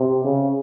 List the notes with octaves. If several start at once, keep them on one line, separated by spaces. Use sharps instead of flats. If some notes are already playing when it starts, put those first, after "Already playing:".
Already playing: C3
C#3